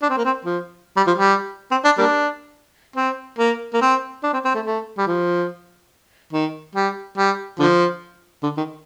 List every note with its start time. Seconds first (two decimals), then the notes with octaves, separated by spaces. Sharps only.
0.02 D4
0.09 C4
0.17 A#3
0.25 C4
0.45 F3
0.97 G3
1.07 F3
1.18 G3
1.71 C4
1.84 D4
1.98 G3 A#3 D4
2.96 C4
3.39 A#3
3.74 A#3
3.82 C4
4.24 D4
4.33 C4
4.45 C4
4.55 A3
4.66 A3
4.98 G3
5.07 F3
6.33 D#3
6.75 G3
7.18 G3
7.60 D3 F3
8.44 D3
8.58 D#3